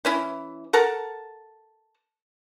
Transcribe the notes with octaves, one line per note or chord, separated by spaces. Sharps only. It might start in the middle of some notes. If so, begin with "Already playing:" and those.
E3 C#4 E4
A4 A#4 F#5 A5